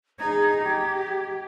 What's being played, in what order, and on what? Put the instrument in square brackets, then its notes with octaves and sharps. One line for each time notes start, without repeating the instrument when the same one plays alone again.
[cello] D#4 G#4 [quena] G#6
[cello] G4